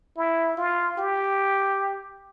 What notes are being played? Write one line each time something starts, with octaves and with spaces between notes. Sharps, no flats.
E4
F4
G4